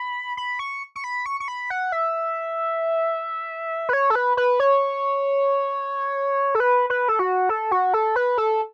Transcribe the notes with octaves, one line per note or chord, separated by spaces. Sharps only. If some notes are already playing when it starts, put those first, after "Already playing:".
Already playing: B5
B5
C#6
C#6
B5
C#6
C#6
B5
F#5
E5
B4
C#5
A4
B4
B4
C#5
A4
B4
B4
A4
F#4
A4
F#4
A4
B4
A4